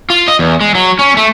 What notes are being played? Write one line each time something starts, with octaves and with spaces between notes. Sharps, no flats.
F4
D#5
E2
G#3
F#3
C#4
A3